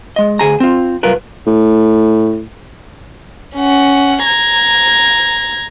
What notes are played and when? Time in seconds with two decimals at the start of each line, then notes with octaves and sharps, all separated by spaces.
0.16 G#3 D#5
0.39 D2 G#4 A#5
0.60 C4 F4
1.03 C2 F#2 F4 A#4 B4
1.46 A2
3.56 C#4 F#5
4.26 A#5 G#6